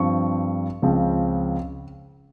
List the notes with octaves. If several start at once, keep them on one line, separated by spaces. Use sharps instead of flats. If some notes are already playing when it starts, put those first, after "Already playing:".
Already playing: G2 F3 C4 C#6
C#2 C#3 F3 C4